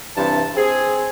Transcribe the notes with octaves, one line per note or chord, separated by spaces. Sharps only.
G2 C3 E3 A5
C4 G#4